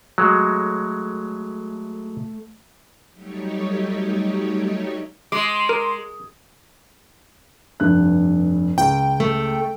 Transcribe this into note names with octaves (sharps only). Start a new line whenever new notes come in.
F#3 G#3 A3
F#3 G3 A3 D#4 G4 C#5
G#3 C6 D6
A#4
F1 G2 F#6
C#2 G5
A3